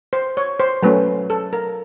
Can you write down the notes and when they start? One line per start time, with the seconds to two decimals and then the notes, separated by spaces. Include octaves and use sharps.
0.13 C5
0.37 C#5
0.60 C5
0.82 F#3 A3 C#4 B4
1.30 A4
1.53 A#4